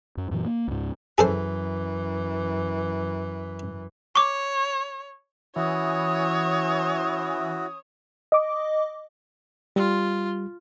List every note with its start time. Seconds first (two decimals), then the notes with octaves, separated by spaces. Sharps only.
0.17 F#2
0.31 F#2 A#2 E3 F#3
0.45 A#3
0.68 C#2 G#2
1.18 F#2 E3 G#4 A4 C5
4.16 C#5 C#6 D6
5.56 E3 C#4 E4 F#4 C#5 D#6
8.32 D#5 D6
9.76 G3 F4